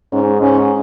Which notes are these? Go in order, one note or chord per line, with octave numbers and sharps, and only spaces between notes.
G#2 C#4
G#2 C#4